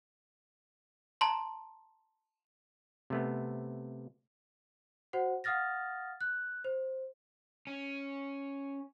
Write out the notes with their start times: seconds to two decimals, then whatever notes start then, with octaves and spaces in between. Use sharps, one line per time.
1.21 A5 A#5 C6
3.10 C3 A3 B3
5.13 F#4 C5 F#5
5.44 F5 F#5 D#6 F6 A6 A#6
6.21 F#6
6.65 C5
7.67 C#4